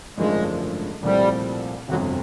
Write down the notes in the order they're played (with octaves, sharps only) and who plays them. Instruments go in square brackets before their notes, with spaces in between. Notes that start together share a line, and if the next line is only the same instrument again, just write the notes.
[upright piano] G#1 F#2 D3 F3 A3 [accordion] G#3
[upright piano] C2 A#2 F3 A3 C4 [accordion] G3
[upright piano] G1 F2 C3 [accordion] F#3